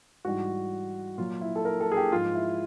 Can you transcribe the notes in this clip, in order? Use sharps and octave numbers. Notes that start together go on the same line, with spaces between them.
G#2 E3 G3 F#4
A#2 F#3 F4
E4
A4
A#4
A4
G#4
G4
G#2 F3 G#3 F4
E4